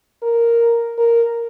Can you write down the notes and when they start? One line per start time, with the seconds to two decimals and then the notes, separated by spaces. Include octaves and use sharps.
0.22 A#4
0.98 A#4